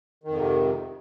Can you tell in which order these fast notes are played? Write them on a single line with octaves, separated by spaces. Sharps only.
D#3 F2 G#2 C3